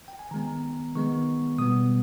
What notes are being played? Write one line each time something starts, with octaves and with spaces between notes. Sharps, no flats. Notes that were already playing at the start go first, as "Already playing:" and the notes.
G5
G#5
D#3 G#3 B3 A#5
D#3 G#3 B3 C#6
B2 G3 B3 D#6